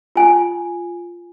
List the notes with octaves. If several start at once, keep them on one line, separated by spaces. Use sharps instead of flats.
F4 G#5